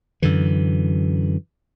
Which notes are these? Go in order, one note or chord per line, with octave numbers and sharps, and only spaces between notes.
F#2 D3 E3